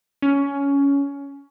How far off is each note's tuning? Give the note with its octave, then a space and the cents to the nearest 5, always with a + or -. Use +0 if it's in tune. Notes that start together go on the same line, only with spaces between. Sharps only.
C#4 +15